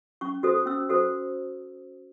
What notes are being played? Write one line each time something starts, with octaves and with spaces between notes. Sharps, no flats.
C#4 C#6
F#4 A4 C5 D#6
C#4 E6
F#4 A4 C5